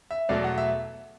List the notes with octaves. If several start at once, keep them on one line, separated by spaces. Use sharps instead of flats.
E5
E2 B2 F#3 A3 D5
F#5
E5